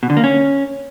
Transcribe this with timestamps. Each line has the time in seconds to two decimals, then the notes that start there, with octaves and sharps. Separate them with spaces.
0.03 B2
0.10 D3
0.17 A#3
0.24 C#4